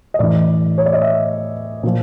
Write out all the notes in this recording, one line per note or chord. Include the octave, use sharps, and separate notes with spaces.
D#5
A2 E3 D5
C#5
D5
D#5
E5
A#2 F3